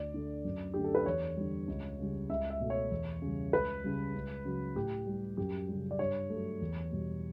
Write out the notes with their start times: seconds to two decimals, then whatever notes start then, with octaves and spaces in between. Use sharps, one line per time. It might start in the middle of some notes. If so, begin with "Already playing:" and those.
Already playing: D2 D5
0.14 D3 A3
0.45 F#2
0.74 D3 A3 G4
0.84 A4
0.95 B4
1.06 E2 C#5
1.36 D3 G3
1.68 C#2
1.99 C#3 G3
2.30 C#2 E5
2.50 E5
2.60 B2 A3
2.70 C#5
2.91 E2
3.22 C#3 G3
3.53 C#2 B4
3.84 C#3 G3
4.14 C#2
4.45 C#3 F#3
4.76 A2 G4
5.07 G3
5.37 F#2 G4
5.69 C#3 G3
5.91 D5
5.99 G2 C#5
6.30 F#3 A3
6.61 E2
6.92 B2 G3